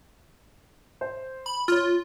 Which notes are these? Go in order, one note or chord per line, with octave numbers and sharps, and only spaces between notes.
C5
B5
F4 C#5 F6